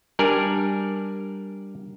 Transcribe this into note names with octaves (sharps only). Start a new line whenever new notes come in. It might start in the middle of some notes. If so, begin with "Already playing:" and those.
G3 D4 A#4 D5 G#5